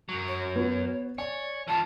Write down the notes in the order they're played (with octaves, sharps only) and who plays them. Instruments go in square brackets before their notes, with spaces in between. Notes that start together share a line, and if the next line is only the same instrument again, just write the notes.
[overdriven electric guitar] F#2 F#3
[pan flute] C#5
[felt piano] B3 F#4
[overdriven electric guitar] C#5 [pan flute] D5 [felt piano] G#5
[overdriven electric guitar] E3 F4 [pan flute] A5